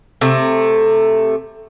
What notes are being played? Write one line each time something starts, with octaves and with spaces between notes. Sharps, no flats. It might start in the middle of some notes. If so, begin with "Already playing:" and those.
C3 A3